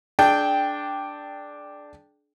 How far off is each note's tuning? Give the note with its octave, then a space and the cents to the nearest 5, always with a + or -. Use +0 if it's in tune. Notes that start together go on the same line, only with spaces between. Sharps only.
D4 +0 G#4 +40 G5 +0